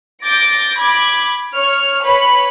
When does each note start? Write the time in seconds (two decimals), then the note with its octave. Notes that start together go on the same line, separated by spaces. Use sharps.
0.25 D6 G6 A6 A#6 D7
0.81 B5 D6 G#6
1.55 C#5 F6
2.05 B4 C#5 B5